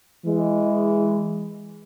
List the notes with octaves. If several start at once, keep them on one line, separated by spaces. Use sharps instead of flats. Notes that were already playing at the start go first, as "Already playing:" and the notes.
E3 G#3